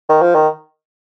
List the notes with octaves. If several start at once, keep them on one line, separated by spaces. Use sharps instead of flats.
D#3
F3
D#3